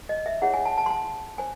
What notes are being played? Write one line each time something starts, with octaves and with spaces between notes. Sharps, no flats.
D#5
E5
E4 G#4 C#5 F#5
G#5
A5
A5
C6
A5
C5 G#5